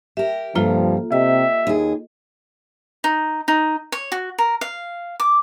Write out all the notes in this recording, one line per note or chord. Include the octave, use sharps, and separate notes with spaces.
G4 A#4 E5
G2 C3 F3 G3 A#3 F4 A4
C3 G4 D#5 E5
D#2 D#4 G#4
D#4
D#4
C#5
F#4
A#4
F5
D6